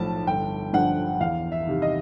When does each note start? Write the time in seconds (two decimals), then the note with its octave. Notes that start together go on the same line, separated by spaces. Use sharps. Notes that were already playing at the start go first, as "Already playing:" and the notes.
Already playing: B1 A2 F3 A5
0.27 G1 G5
0.73 G2 D3 F3 F#5
1.20 E2 F5
1.52 E5
1.67 C3 D#3
1.82 D#5